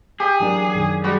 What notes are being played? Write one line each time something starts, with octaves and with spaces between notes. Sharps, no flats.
G4 G#4 D#6
E3 F#3 A#3 D4
F#2 B2 D#3
G3 G#3 F#4